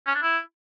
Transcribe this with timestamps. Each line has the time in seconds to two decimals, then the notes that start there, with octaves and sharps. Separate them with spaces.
0.07 C#4
0.15 D4
0.22 E4